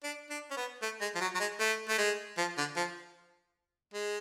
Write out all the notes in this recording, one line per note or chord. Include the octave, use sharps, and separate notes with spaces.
D4
D4
C#4
B3
A3
G#3
F3
F#3
F#3
G#3
A3
A3
G#3
F3
D3
F3
G#3